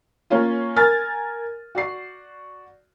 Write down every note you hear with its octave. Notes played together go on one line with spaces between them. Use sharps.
A#3 C#4 F4
A#4 G#5 F6 A6
F#4 D5 C7